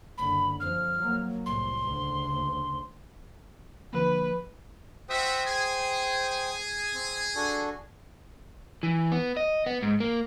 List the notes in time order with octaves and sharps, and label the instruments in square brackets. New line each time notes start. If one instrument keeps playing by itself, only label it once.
[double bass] F#1 D3 [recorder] B5
[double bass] F2 F3 [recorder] F6
[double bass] F#3 A#3
[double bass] C2 A2 [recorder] C6
[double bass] D2 C#3
[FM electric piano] D3 F3 A#3 [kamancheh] B4
[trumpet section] F#4 E5 [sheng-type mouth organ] C5 G5 D#6
[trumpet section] G#4 G#5
[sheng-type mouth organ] C4
D4 F#4 A4
[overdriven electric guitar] E3
B3
D#5
B3
G#2
A#3